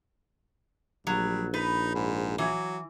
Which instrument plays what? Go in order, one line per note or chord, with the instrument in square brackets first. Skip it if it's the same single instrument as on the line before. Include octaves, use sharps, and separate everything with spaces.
[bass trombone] A#1 [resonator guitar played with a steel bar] F#3 [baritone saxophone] G3
[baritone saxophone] D#4 [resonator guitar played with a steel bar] B4
[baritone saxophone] G#2
[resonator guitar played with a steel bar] E3 [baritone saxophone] F#3